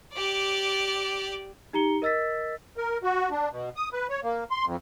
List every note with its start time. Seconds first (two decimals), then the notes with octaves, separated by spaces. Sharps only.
0.14 G4 D5
1.73 D#4 G4 A#5 C#7 G7
2.02 A#4 D#5 E6 A6 B6
2.77 A#4
3.03 F#4
3.31 D4
3.51 B2
3.76 D#6
3.93 B4
4.10 C#5
4.23 A#3
4.51 C6
4.65 F2